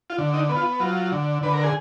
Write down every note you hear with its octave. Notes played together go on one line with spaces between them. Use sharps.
F4
D3
D#4
B3
F4
F#3 F4
D3
D3 B4
A#4
G#4